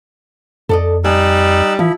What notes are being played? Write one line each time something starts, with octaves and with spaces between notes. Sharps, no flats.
F2 A4 D5 D#5
G3 D#4 G#5 E6 F#6
E3 F3 E4